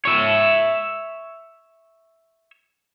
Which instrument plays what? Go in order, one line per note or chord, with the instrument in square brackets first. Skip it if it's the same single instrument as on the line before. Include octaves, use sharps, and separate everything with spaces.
[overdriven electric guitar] C#5 E5